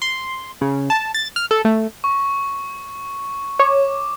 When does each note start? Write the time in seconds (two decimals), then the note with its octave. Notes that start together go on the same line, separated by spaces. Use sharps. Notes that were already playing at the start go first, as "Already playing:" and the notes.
0.02 C6
0.61 C#3
0.90 A5
1.14 A6
1.36 F6
1.51 A4
1.65 A3
2.04 C#6
3.59 C#5 D6